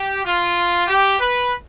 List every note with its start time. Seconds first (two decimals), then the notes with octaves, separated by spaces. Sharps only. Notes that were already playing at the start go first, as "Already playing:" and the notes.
Already playing: G4
0.24 F4
0.87 G4
1.19 B4